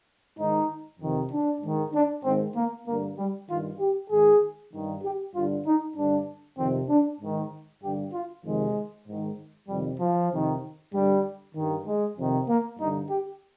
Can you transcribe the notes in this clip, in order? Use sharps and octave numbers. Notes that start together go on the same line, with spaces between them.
G#2 D#3 D#4
F2 C3 D#3
D4
G#2 D#3
D4
G#2 D#3 C4
A#3
G2 D3 A#3
G3
G2 D#3 F4
G4
G#2 D#3 G#4
G2 D#3
G4
G2 D3 F4
D#4
G2 D3 D4
F2 C3 D#3 C4
D4
G#2 D#3
G2 D3 G4
F4
F2 C3 D#3 G#3
G#2 D#3
F2 C3 D#3 G3
F3
F2 C3 D#3
G2 D3 G3
G2 D#3
G#3
F2 C3 D#3
A#3
G2 D3 D#4
G4